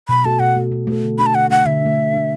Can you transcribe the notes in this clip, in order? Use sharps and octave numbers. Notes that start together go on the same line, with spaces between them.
B2 B5
A3 F#4 A4 A5
B2 F#5
A3 F#4 A4
B2
A3 F#4 A4
D3
A3 D4 B5
A5
D3 F#5
A3 D4 F#5
D3 E5
A3 D4
D3
A3 D4